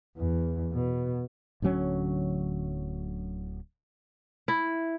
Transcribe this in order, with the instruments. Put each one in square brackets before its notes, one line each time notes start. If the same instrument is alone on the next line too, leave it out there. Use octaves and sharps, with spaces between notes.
[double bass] E2
B2
[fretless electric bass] D1 D3 F#3 C#4
[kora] E4